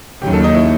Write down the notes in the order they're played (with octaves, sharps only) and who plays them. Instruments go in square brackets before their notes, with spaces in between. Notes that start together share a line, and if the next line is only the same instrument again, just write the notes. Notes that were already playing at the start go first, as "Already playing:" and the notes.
[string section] D#2 C#3 F#3 [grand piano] G4
[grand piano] A4
D#4
E4